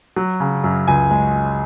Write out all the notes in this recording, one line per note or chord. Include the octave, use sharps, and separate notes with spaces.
F#3
C#3
F#2
C#2 G#5
G#3